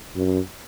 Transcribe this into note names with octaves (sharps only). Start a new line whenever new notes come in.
F#2